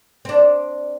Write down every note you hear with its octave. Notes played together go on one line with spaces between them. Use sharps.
C4 D4